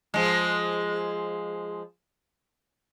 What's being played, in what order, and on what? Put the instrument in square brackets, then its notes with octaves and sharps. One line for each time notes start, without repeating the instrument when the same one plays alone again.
[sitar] F3 G#3